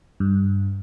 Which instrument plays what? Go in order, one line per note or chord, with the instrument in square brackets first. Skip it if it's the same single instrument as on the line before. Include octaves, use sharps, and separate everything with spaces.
[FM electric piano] G2